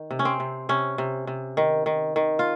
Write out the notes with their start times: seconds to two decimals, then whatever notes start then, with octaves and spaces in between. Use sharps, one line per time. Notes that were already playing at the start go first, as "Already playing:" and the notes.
Already playing: D#3
0.11 C3
0.19 C#4
0.25 C4
0.40 C3
0.69 C3 C#4
0.98 C3
1.27 C3
1.57 D#3
1.86 D#3
2.16 D#3
2.39 F4